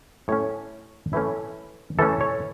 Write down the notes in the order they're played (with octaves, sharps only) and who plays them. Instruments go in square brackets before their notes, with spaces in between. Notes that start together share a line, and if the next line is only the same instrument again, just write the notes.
[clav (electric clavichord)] A2 A3 C#4 C#5
E3 A3 C#4 E4
E3 A3 C#4 A4
C#5